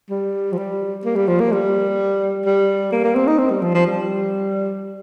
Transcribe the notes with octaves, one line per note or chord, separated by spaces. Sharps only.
G3
F3
G3
A#3
G3
F3
A#3
G3
G3
A#3
A#3
C4
D#4
C4
G3
F3
F3
G3